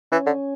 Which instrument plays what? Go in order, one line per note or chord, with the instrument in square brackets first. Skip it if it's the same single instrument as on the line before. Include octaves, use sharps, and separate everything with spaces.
[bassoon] E3 [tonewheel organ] C#4
[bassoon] D3